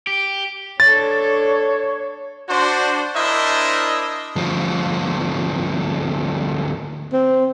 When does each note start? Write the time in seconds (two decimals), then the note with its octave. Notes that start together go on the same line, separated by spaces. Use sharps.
0.07 G4
0.80 D4 A4 C#5 A6
2.49 D4 F#4 C5
3.16 D4 E4 A#4 C5 D#5 E5
4.36 D2 F3
7.13 C4